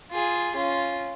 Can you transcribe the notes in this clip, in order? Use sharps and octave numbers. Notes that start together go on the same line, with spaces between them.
F4 G#4
C#4 F4